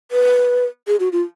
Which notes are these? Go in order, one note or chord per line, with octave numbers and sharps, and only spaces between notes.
B4
G#4
F#4
F4